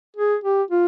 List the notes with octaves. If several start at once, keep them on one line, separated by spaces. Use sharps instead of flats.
G#4
G4
F4